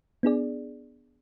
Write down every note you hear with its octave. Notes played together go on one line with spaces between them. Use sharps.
B3 D4 G#4 D5